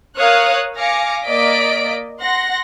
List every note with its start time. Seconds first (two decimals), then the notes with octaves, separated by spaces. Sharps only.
0.18 A#4 C#5 F5 D#6 F#6
0.76 F5 G#5 D6 A#6 C#7
1.24 A#3 D5 D#5 B6 D7
2.21 F#5 C6 A#6